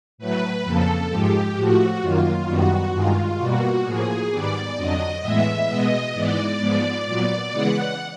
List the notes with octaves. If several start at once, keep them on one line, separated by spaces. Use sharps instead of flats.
A2 F#3 A3 B4
F2 C#3 F3 A#3 A4
G#2 F3 G#3 G4
A2 F3 A3 F#4
F#2 D#3 F#3 A#3 F4
F#2 D#3 G3 B3 F#4
G2 D#3 G#3 F4
B2 G3 A#3 F#4
A2 F3 A#3 G#4
G#2 D#3 G3 B3 D5
F2 D3 F#3 D#5
A2 E3 G#3 B3 E5
B2 G#3 B3 D#5
G#2 E3 G#3 B3 D5
G#2 F3 G#3 B3
A#2 F#3 B3
C#3 E3 G#3 B3 F#5